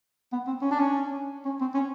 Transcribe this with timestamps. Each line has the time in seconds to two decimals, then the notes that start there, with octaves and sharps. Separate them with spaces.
0.33 B3
0.47 C4
0.62 C#4
0.71 D4
0.79 C#4
1.45 C#4
1.61 C4
1.74 C#4